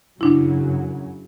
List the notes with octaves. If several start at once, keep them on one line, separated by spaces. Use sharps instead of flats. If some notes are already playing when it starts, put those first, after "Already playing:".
F#2 C#3 F#3 D4 E4